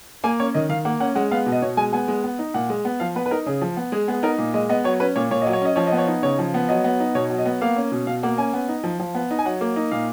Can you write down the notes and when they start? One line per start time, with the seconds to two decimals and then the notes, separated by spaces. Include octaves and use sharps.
0.24 A#3 G#5
0.40 C#4 C#5
0.54 D#3 D#5
0.69 D#3 F5
0.85 A#3 F#5
1.00 C#4 F#5
1.15 G#3 F#5
1.31 B3 F5
1.46 B2
1.52 D#5
1.62 B2 C#5
1.77 G#3 G#5
1.93 B3 G#5
2.08 G#3
2.24 B3
2.39 D#4
2.54 A#2 F#5
2.70 G#3
2.85 B3
3.00 F3 F5
3.15 B3 B4
3.26 B4
3.31 D#4 A#4
3.46 C#3 G#4
3.61 F3
3.77 B3
3.92 G#3 G#4
4.08 B3 G#4
4.23 D#4 A#4
4.38 A#2
4.54 G#3 D#5
4.69 B3 D#5
4.84 F#3 C#5
5.00 C#4 B4
5.16 A#2 C#5
5.31 A#2 C#5
5.42 F#3 D#5
5.53 C#5
5.62 C#4 D#5
5.76 F3 C#5
5.87 D#5
5.92 B3
5.98 C#5
6.07 D#4
6.23 C#3 C#5
6.39 F3
6.54 B3
6.69 F#3 D#5
6.84 B3
7.00 D#4
7.15 B2 C#5
7.30 F#3
7.38 D#5
7.46 B3
7.61 A#3 F5
7.76 C#4
7.92 B2
8.07 B2 F5
8.23 A#3 F#5
8.38 C#4 G#5
8.53 B3
8.68 D#4
8.84 F3
9.00 F3
9.15 B3
9.31 D#4
9.39 G#5
9.45 F#3 F#5
9.61 A#3
9.76 D#4
9.91 A#2 F5